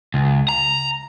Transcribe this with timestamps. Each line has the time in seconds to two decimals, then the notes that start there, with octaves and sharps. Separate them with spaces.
0.14 C#2
0.49 A#5